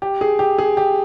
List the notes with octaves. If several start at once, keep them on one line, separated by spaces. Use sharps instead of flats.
G4
G#4
G4
G#4
G4